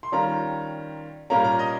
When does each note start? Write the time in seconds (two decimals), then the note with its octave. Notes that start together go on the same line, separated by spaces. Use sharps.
0.03 C6
0.12 D#3 G3 C#4 F4 A#5
1.30 A#2 G3 A#3 C#4 F4 A#5
1.44 A#5
1.59 D#5